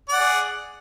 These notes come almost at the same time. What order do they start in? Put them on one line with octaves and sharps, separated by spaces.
D5 F#5 G#4